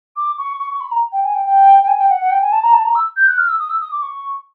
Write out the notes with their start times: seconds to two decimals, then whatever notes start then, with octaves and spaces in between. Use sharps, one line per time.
0.16 D6
0.38 C#6
0.59 C#6
0.70 C#6
0.80 B5
0.91 A#5
1.12 G5
1.23 G#5
1.34 G5
1.44 G5
1.82 G5
1.87 G#5
1.98 G5
2.09 F#5
2.20 F#5
2.30 G5
2.41 G#5
2.52 A5
2.62 A#5
2.73 A5
2.84 A#5
2.95 E6
3.16 G6
3.27 F#6
3.37 F6
3.48 E6
3.59 D#6
3.69 E6
3.80 D#6
3.91 D6
4.02 C#6